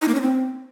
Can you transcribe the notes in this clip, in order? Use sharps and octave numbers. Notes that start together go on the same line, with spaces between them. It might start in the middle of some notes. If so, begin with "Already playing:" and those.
D#4
A#3
C#4
C4